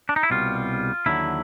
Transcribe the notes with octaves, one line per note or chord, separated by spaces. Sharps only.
D4
D#4
E4
C2 B2 G3 F4
D#2 D3 F#3 E4